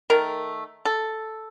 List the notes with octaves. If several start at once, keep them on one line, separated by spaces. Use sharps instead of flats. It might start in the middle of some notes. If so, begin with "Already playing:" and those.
D#3 A3 A#4
A4